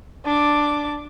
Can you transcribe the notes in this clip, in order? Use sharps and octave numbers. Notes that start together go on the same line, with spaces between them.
D4 D6